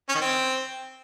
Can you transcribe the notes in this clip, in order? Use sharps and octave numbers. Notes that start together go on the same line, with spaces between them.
C#4
D#3
C4